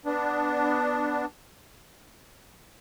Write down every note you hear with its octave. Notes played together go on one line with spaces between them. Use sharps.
B3 D4